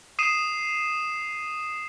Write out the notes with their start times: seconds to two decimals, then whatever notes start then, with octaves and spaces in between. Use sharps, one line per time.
0.19 D#6 C7 D#7 E7